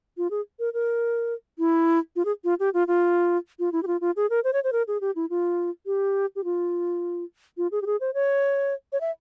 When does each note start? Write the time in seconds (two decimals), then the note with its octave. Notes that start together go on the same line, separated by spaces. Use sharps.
0.17 F4
0.31 G#4
0.59 A#4
0.74 A#4
1.59 E4
2.16 F4
2.25 G#4
2.44 F4
2.60 G4
2.74 F4
2.88 F4
3.59 F4
3.72 E4
3.83 G4
3.87 F4
4.01 F4
4.16 G#4
4.30 A#4
4.44 C5
4.53 C#5
4.64 C5
4.73 A#4
4.88 G#4
5.01 G4
5.16 E4
5.30 F4
5.86 G4
6.36 G4
6.44 F4
7.57 F4
7.72 G#4
7.82 G4
7.86 G#4
8.01 C5
8.14 C#5
8.93 C#5
9.01 E5